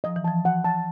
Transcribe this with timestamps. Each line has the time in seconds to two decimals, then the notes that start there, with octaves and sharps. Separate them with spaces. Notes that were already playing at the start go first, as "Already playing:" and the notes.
0.04 F3 D#5
0.16 E3
0.24 F3 A5
0.45 F#5
0.64 A5